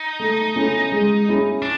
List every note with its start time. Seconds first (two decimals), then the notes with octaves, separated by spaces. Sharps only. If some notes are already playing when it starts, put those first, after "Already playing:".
Already playing: D#4
0.19 A3
0.56 C#4 E4 A4
0.92 G#3
1.27 C#4 E4 G#4
1.62 D4